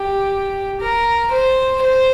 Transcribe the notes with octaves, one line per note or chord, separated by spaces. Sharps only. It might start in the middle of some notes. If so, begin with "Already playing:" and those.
Already playing: G4
A#4
C5
C5